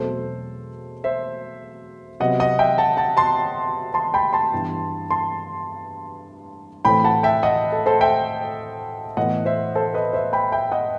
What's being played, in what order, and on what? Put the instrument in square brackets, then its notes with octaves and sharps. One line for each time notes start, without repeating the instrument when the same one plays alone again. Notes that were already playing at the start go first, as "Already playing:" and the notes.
Already playing: [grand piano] E2 B2 F#3 A3 C4 A4 C5
C5 E5
C3 F#3 B3 D#5 F#5
D#5 F#5
E5 G5
F#5 A5
F#5 A5
A5 C6
A5 C6
G5 B5
A5 C6
G2 E3 B3
A5 C6
A2 E3 A3 C4 G5 B5
F#5 A5
E5 G5
D#5 F#5
A4
A4 C5
E5 G5
A2 E3 B3 D#5 F#5
C5 E5
A4 C5
B4 D#5
C5 E5
G5 B5
E5 G5
D#5 F#5